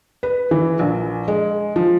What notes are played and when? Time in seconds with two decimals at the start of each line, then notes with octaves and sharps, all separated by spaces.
0.23 B4
0.51 E3
0.79 A#1
1.28 G#3
1.76 F3